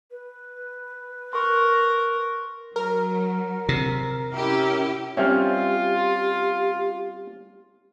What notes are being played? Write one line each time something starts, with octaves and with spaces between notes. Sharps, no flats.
B4
A#4 C6 C#6 F#6
F#3 A#4
C3
C#4 E4 G4
G3 C4 C#4 F4 G4 E5 F6